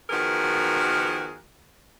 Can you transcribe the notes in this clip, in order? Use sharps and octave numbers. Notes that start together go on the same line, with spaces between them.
D#3 F3 B3 F#4 G#4 A#4